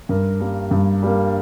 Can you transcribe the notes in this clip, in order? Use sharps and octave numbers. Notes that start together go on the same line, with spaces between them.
G2 A#4
G3 A#3
G2
G3 A#3